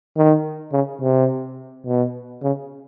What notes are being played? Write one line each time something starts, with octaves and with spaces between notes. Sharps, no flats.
D#3
C#3
C3
B2
C#3